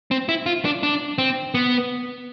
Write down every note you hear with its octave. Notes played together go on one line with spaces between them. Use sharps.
C4
E4
F4
D4
D4
C4
B3